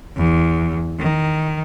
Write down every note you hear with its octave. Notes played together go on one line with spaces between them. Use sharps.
E2
D#3